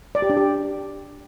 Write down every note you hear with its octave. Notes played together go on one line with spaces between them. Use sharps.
D5
G4
D4
G4